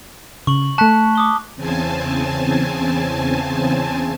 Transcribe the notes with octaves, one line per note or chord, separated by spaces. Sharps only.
C#3 C#6 F#7
A3 A5 C#6 F#6 B6
D6 D#6 G7
E2 C#3 C4 G#5 A5